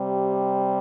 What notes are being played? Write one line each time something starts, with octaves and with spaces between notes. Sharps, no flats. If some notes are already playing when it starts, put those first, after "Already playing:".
Already playing: C3 G3